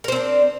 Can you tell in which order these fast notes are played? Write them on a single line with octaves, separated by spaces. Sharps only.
A#4 C5 C4 D4